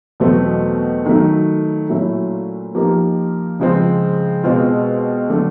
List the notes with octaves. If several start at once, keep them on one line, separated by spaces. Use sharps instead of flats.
E2 B2 F#3 A3 C4
D#3 F#3 A3
A#2 F#3 A3 C#4 E4
F3 A#3 D#4 G4 A#4
C#3 F3 G#3 C4
B2 G#3 C4 F4
D3 F#3 A3 D4